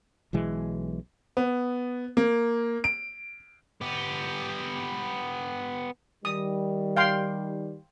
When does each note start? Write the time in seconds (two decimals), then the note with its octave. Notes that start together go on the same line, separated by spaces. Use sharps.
0.33 B1 B2 E3 G#3
1.37 B3
2.17 A#3
2.84 D7
3.81 B3 G4
6.25 D#3 G3 D#6
6.96 F5 G5 C6